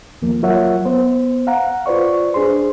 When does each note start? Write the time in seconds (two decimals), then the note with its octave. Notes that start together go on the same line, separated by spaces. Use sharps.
0.22 D#2 F3 A#3
0.42 F#3 F4 A#4 C#5 E5 F#5
0.85 B3 C5
1.47 F5 F#5 A#5
1.86 F4 B4 C5 D5 C#6
2.34 D4 G#4 C5 C6